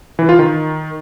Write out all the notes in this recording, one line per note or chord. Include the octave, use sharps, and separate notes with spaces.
E3
F4
D#3